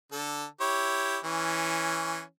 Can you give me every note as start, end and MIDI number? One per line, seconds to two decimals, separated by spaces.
0.12 0.45 50
0.12 0.45 69
0.61 1.18 64
0.61 1.18 67
0.61 1.18 73
1.24 2.21 52
1.24 2.21 61